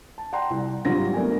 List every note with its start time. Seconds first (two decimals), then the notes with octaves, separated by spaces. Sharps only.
0.18 A5
0.32 D5 F#5 G5 A#5 C6
0.50 C2
0.85 G#1 F#3 G3 C4 F4 A#6
1.13 A3 B3 D4 A#4 G#5